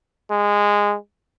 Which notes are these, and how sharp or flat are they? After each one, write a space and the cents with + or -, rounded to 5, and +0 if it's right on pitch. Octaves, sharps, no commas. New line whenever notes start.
G#3 -15